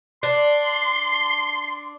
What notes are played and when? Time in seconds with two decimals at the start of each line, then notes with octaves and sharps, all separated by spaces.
0.23 D4 C6